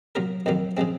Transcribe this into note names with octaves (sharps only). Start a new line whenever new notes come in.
F#3 A#3 F4 A#4
F2 D#3 F#3 A#3 F4
C#3 F3 G#3 C4